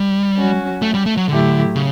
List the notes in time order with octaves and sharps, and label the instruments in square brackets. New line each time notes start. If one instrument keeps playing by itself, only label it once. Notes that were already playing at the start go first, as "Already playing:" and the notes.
Already playing: [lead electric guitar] G3
[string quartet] F#3 C#4 F#4
[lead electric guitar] A3
G3
A3
F#3
[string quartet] A2 F#3 A3 E4 G4 [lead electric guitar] D3
[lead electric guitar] C#3